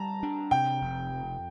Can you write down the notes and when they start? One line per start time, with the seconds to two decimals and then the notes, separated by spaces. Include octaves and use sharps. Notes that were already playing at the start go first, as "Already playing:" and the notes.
Already playing: G3 A5 A#5
0.23 D4
0.51 C3 G5
0.81 F1
1.11 F2